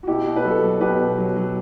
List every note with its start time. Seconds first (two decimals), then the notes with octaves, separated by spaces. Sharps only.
0.03 F#4
0.07 B2 E4 G4
0.26 B2
0.36 B4
0.44 F#3 F#4 A4
0.62 F#3
0.81 B2 G4 B4
0.99 B2
1.18 F#3
1.36 F#3